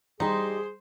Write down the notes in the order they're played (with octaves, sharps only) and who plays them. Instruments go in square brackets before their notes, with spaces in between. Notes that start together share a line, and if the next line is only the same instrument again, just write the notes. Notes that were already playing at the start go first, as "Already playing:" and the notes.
[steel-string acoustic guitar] G3 G4 [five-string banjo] D#4 [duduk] G#4 [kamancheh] C5 C6